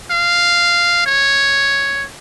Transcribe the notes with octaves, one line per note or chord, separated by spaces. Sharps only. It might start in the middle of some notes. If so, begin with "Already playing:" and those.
F5
C#5